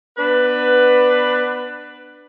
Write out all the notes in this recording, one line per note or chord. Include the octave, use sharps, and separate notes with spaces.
B3 D4 B4